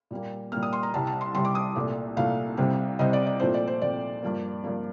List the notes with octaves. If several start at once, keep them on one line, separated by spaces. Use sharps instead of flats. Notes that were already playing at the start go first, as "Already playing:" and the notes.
A#2 G3 A#3
A#2 G3 A#3 F6
D#6
C6
A#5
C2 C3 G3 A5
A5
C6
C2 C3 G3 C6
D6
D#6
C2 A#2 A3
C2 A#2 A3 F5
C2 C3 G3 C4
C2 C3 G3 C4 D#5
D5
D5
A#2 F3 A3 C4 C5
D5
C5
A#2 F3 A3 C4 D5
G2 F3 A#3
G2 F3 A#3